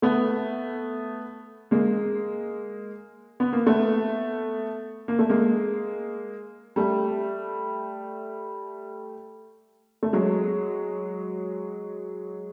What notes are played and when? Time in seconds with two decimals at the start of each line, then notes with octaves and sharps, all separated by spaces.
0.02 A3 B3
1.71 G#3 A#3
3.40 B3
3.53 A#3
3.66 A3 B3
5.08 A#3
5.19 A3
5.30 G#3 A#3
6.76 G3 A3
10.03 A3
10.13 F#3 G#3